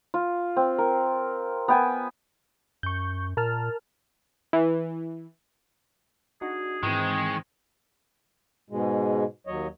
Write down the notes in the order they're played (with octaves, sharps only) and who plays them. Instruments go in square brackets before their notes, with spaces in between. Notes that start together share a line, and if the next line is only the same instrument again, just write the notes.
[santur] F4
C4
A#4
B3 G5 G#5
[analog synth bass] F#2 [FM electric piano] C#6 G6
[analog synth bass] A#2 [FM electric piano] A#4 A5 F6
[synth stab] E3
[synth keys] D4 D#4 F#4 [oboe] G#4
[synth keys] G#2 E3 C4 [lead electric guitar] D#3 [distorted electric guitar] G#3
[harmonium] G#2 B2 G#3
D#2 F#3 C#5 D#5